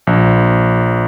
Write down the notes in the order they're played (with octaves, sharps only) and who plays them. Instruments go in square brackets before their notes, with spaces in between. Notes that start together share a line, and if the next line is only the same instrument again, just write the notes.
[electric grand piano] A#1